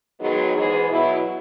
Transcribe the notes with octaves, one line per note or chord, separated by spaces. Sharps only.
D#3 F#3 G#3 B3 D#4 G#4
G#2 E3 G#3 B3 D#4 G#4
B2 F#3 B3 E4